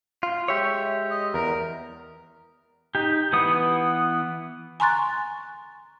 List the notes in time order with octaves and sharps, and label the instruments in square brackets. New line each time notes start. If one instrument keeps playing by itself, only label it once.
[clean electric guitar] F4
[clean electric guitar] G#3 G4 C#5 [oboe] E5
[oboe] D#5
[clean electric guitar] E2 [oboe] A#4
[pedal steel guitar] D#4 G4
E3 B3 D#6
[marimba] G#5 A#5 C6 C#6 F#6 A6